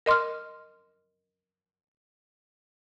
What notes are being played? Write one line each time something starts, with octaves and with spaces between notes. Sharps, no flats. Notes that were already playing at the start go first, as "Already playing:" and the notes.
A#4 D#5 C6 D6 F6